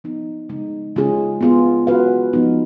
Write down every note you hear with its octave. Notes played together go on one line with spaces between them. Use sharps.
F3 B3 D#4
C#3 G#3 D#4
C#3 G#3 C#4 F4 G#4
B3 F4 G#4
G#3 C#4 F#4 B4 F5
F3 G#3 B3 D#4